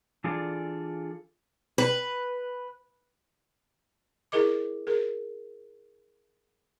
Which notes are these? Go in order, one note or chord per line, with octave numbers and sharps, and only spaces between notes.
E3 D4 F4 G#4 A4 D5
B4
E4 G#4 A#4 D#5 D6
G#4 A#4